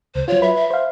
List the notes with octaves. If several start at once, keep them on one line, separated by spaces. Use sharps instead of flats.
C#2 C5
F#3 F4 C#5
B4 E5 B5
E5
C5 F5